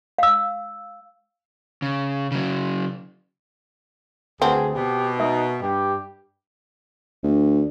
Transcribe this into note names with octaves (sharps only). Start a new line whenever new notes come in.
F5 E6
C#3
C#3 F#3
D2 C4 G#4 B4 F#5 A5
B2 G4
D#4 A#4 E5 D#6
G2 G4
D2